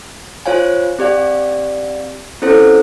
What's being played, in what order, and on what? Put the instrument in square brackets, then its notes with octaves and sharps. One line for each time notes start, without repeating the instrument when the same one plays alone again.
[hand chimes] F4 C5 C#5 F5 G#5
C4 G4 D5 F5
C4 C#4 E4 A4 C5